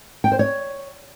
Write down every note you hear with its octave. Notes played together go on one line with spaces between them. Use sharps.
G5
C5
C#5